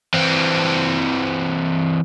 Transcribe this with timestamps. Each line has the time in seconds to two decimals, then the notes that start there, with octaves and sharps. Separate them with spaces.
0.14 E3 C4